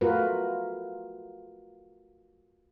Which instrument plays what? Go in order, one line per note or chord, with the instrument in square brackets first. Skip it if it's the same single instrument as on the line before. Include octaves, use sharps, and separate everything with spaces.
[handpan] A3 F4 F#4 A#4 B4